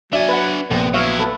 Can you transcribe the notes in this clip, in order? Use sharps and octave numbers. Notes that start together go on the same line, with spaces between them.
F#3 D4 D5 E5 G#5
B4 F#5
A#1 C3 B3
F#3 E4 C#5 E5 F5
A4 B4